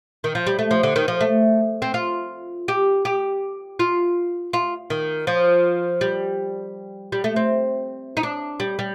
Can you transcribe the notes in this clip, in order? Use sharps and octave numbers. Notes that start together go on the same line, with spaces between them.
D#3
F3
G3
A3
F3
D3
D#3
F3
A3
C4
F4
G4
G4
F4
F4
D#3
F3
G3
G3
A3
C4
D#4
D4
G3
G3